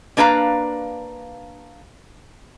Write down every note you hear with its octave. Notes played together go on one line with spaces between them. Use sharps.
A#3 D4 B4 F5 A#5